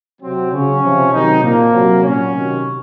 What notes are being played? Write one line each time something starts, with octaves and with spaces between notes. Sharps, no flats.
C3 F#3 C4
C#3 F#3 C#4
C3 F3
C3 D#3 F#3 D#4
A#2 F3 A#3
C3 F#3
A#2 F#3 C#4
C3 D#3 F#3